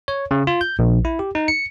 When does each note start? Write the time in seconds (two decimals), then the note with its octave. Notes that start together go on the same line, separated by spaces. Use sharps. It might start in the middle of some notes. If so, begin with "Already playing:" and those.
0.08 C#5
0.31 C#3
0.47 F4
0.61 G6
0.79 A#1
1.05 E4
1.19 G4
1.35 D#4
1.48 C#7